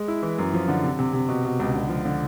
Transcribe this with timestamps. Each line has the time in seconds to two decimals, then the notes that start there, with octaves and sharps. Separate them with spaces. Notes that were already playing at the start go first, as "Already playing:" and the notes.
Already playing: G#3
0.08 E4
0.22 E3
0.38 F#2
0.54 F3
0.68 D3
0.83 C3
0.99 C3
1.13 C3
1.29 B2
1.45 B2
1.59 C#2
1.75 D3
1.89 F3
2.05 D3